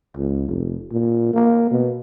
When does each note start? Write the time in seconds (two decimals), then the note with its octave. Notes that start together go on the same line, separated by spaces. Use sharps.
0.17 C#2
0.48 F1
0.91 A#2
1.34 A#3
1.71 B2